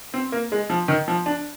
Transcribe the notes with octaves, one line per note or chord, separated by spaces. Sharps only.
C4
A#3
G#3
F3
D#3
F3
D4